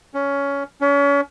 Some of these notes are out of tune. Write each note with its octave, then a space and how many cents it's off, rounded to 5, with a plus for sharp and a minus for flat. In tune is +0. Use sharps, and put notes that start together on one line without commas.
C#4 +15
C#4 +35